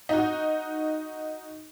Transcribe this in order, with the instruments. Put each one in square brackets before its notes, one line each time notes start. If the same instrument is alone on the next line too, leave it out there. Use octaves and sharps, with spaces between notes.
[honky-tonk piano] D#4 F#4